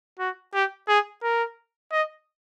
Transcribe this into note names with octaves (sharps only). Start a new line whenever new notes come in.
F#4
G4
G#4
A#4
D#5